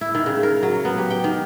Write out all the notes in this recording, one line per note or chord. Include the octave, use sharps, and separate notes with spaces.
E4
D#3
C#3
A#4
F#3
B3
G4
G5
D#3